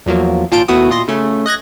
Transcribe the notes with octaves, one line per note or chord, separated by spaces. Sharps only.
E2 F3 F#3 A#3
G#1 A#2 F4 A5 G6 D7
D#2 A3 B3 E4 F#4 D#6
A#2 F4 D#5 C6 A#6
C#3 A3 C#4
D#5 F#6 G#6 A#6